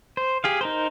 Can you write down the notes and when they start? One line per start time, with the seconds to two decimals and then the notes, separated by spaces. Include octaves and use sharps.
0.17 C5
0.44 G4 G#4 F5
0.61 D#4 A#4 C5